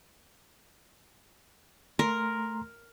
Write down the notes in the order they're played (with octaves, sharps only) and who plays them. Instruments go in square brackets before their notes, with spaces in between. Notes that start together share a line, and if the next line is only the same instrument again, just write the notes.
[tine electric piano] A3 A#5 C6 [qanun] A#4